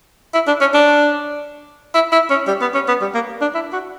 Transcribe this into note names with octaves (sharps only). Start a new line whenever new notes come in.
E4
D4
C#4
D4
E4
E4
C#4
G3
B3
C#4
B3
G3
A#3
D4
E4
F#4